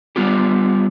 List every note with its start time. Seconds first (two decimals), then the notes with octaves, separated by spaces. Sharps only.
0.16 G3 B3 F4 G4